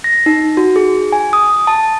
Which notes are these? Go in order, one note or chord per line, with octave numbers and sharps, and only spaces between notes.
A#6
D#4
F#4
G#4
G#5
D#6
A5